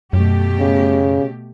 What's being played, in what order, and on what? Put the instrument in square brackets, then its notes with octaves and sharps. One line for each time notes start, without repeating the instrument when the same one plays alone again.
[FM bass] F#2 [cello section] B2 A3 G4
[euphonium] C#3